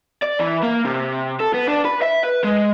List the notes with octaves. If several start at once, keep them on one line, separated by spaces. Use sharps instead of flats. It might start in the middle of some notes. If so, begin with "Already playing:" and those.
D5
E3
A#3
C3
A4
B3
D4
B4
E5
B4
G#3